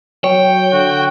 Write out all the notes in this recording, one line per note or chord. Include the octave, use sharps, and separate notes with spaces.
F#3 C#5 G5
D3 F#4